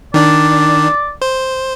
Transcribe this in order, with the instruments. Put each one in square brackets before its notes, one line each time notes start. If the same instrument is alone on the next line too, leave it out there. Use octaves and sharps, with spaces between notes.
[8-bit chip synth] D#3 D4 [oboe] D5
[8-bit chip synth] C5